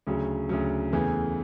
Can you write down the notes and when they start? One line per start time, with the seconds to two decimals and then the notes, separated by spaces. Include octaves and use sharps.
0.07 D2 C#3 F#3
0.49 D2 C#3 F#3
0.93 E2 C#3 E3 A3